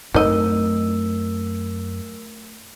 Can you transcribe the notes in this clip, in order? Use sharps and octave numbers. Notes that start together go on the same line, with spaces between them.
F#2 A3 C4 D#4 E4 A#4 D#5 E6